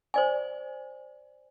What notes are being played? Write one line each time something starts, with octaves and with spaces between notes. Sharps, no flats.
C5 D5 G#5